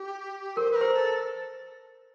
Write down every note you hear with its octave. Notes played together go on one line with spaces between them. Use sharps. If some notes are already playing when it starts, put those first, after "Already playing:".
Already playing: G4
A#4 C5
B4
A#4
C5
A4